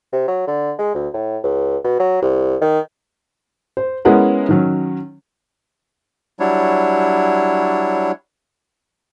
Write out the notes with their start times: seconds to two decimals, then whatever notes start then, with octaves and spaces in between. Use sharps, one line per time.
0.13 C3
0.28 F#3
0.47 D3
0.79 G#3
0.95 D2
1.14 A2
1.43 C#2
1.84 B2
2.00 F#3
2.22 C2
2.61 D#3
3.77 C5
4.05 G#3 B3 C#4 E4 A#4 F#5
4.49 D#3 F#3 C#4
6.40 F#3 G3 D4 E4 C#5